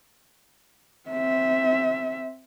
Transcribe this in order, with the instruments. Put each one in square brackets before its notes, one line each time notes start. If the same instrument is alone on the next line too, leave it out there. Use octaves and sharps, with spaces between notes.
[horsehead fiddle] C4 E5